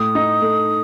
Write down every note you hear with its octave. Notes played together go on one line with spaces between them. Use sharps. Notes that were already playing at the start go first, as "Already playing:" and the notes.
Already playing: A2 D#6
D#4
A3